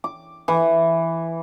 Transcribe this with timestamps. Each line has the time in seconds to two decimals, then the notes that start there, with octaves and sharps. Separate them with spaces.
0.04 D6
0.48 E3